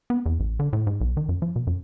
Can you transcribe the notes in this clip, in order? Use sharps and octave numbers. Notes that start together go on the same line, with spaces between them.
B3
E2
A1
D3
A2
G#2
B1
D#3
F#2
F3
B2
F#2